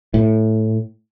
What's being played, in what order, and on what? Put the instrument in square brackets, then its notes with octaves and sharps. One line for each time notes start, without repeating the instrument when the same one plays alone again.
[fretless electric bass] A2